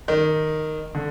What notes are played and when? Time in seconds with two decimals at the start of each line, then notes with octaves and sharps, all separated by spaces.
0.08 D#3
0.95 D3